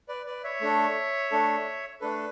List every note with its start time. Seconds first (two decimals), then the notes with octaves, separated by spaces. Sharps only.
0.09 B4 D5
0.26 B4 D5
0.44 C#5 E5
0.61 A3 D4 A4
1.31 A3 D4 A4
2.01 A3 D4 A4 B4